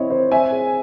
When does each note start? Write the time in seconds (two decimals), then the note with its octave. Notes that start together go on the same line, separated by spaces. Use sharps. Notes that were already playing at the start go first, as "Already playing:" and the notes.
Already playing: C4 E4 C#5 D#5
0.10 C5
0.31 C4 E5 G#5
0.52 G#4